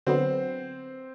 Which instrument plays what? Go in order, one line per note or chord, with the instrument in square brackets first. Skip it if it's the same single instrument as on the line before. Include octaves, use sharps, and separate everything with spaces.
[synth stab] D3 F#3 B3 [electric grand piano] C4 C5